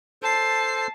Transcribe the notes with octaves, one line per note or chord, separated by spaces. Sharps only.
A4 C5 A5 C7